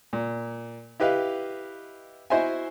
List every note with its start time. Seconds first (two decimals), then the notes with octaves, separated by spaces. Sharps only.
0.13 A#2
1.00 E4 G4 B4 D#5 F5
2.30 E4 F#4 C5 D#5 E5 G#5